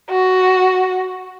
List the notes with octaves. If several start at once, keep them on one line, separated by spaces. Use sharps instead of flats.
F#4